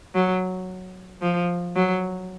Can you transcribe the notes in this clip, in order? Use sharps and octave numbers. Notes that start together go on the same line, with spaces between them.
F#3
F3
F#3